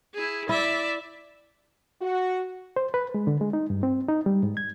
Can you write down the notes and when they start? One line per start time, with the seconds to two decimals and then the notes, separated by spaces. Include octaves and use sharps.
0.14 E4 G#4
0.49 E4 D5 E5
2.02 F#4
2.76 C5
2.94 B4
3.14 G#3
3.27 D3
3.41 G#3
3.53 D#4
3.70 G2
3.83 C4
4.08 D#4
4.26 G3
4.43 G#2
4.57 G#6